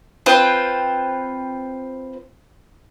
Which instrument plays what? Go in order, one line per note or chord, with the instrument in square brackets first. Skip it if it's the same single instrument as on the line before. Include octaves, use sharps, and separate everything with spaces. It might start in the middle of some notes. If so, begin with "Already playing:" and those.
[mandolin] C4 F4 B4 C5